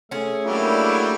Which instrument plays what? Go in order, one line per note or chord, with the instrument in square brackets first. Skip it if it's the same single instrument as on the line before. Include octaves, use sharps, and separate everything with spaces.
[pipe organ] A3 A4 [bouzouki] C#4 G#4
[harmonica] F#3 G3 [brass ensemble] A#3 D4 E4